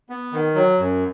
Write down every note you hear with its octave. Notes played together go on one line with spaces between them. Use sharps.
B3
D#3
F#3
F#2